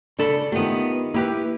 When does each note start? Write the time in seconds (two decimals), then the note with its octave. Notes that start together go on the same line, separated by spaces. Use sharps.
0.19 C#3 D4 A4 B5
0.52 D#3 A3 B3 F4 G4
1.14 A#3 E4 G4 B4